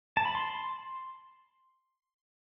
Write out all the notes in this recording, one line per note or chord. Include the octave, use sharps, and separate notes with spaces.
A5
B5
C6